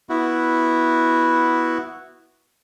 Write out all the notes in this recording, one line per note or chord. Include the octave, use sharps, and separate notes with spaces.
B3 E4 F#4